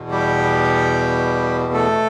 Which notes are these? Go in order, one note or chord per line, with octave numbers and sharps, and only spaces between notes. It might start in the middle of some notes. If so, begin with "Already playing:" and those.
Already playing: E2 B2
G3 G4
A3 A4